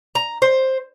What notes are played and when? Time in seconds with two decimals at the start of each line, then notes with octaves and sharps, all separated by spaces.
0.15 A#5
0.42 C5